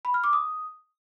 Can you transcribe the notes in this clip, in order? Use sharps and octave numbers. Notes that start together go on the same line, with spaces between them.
B5
F6
D6
D#6